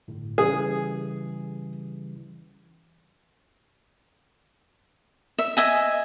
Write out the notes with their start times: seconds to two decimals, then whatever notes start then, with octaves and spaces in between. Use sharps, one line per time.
0.08 G1 A2
0.38 C#3 E3 G3 G#4
5.39 E5
5.57 D#5 E5 G#5